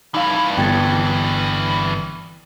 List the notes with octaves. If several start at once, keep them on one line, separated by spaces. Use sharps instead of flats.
G2 E3 D#4 F5 B5
G1 G5 G#6 A6